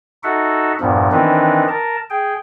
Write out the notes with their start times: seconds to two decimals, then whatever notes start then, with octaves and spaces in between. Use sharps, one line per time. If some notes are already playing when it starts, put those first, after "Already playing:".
0.24 D#4 F#4 A4 E5 F#5
0.81 E2 G2 A#2 F3
1.12 D#3 E3 C4 D4 D#4 B4
1.68 A#4 A5
2.10 G#4 G5